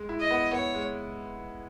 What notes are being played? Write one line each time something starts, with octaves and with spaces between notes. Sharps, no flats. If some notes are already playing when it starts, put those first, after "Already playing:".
Already playing: G#3
E4
D#5
B3
B3 C#5
G#3